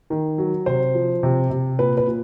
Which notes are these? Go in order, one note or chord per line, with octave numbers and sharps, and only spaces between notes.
D#3
F#3
C3 C5
F3
C3
C3
A#2 B4
B4
A#2